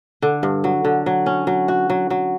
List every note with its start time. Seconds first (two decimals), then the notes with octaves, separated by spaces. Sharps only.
0.22 D3
0.43 G2
0.64 F#3
0.85 D3
1.06 F#3
1.26 C#4
1.47 F#3
1.68 F#4
1.90 F#3
2.10 F#3